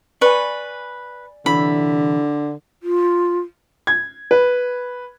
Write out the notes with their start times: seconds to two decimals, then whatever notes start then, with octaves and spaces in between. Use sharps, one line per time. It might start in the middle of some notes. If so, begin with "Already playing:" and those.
0.21 B4 D5 G#5 C#6
1.46 C2 D3 E3 E4 B5
2.83 F4
3.87 G#6
4.31 B4